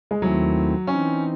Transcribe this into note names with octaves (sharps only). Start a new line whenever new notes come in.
G#3
D#2 D#3 F#3 A3 C4 E4
E3 C4 C#4 D#4